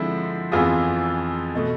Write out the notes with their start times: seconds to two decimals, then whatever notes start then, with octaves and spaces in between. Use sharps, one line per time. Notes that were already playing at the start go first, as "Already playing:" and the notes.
Already playing: D3 F3 G#3 C4 E4
0.52 F2 E3 B3 F4 G#4
1.55 B2 A3